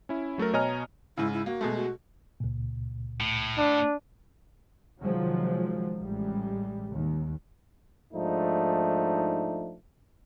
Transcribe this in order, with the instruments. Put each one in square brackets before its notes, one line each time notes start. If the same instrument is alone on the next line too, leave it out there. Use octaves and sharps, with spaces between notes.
[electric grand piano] C#4 E4
F#3 A3 A4 A#4
B2 C#5 D#5 G#5 A#5 F6
[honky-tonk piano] G#2 C#3 [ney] E4
[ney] E4
[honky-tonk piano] A#3 [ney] F#4
[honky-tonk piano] B2 G#3 A3
[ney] F#4
[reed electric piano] C#2 A#2
[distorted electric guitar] A2
[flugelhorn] D4
[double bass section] C3 D#3 F3 F#3 G#3
A1 G3 G#3
D#2
[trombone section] G#2 F3 A3 D4 D#4